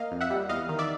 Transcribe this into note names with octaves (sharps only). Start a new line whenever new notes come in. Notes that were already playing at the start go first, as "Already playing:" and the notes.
Already playing: A#3 D#5 F5
F2
E5 F#5
G3
E2 D#5 F5
D#3
D5 E5